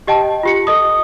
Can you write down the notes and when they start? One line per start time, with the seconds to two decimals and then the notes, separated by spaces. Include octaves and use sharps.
0.07 G4 D#5 G5 A5
0.43 F4 G4 C#7
0.67 A4 D#5 D#6